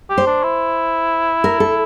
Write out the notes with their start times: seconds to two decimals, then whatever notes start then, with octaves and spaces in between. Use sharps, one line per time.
0.09 G4
0.18 C5
0.26 D4
0.43 E4
1.44 A#4
1.60 A4